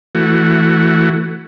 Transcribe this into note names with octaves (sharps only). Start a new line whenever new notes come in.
E3 A3 F#4